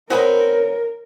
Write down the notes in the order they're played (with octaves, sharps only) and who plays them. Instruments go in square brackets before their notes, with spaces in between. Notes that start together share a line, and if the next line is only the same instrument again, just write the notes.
[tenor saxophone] C4 [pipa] F#4 D#5 B5 [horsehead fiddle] A#4 [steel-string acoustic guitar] B4 C#5